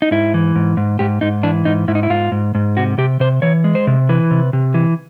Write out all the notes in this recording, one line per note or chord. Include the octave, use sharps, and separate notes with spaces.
D#4
G#2 E4
E3
G#2
G#2
G#2 G4
G#2 D#4
E3 D4
G#2 D#4
G#2 E4
D#4
E4
G#2 F4
G#2
G#2
C3 F#4
C3 G4
C3 C5
E3 C#5
G#3
C5
C3
E3 B4
C3
C3
E3